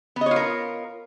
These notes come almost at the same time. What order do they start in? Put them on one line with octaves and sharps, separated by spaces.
B3 D#5 C#5 F4 A#4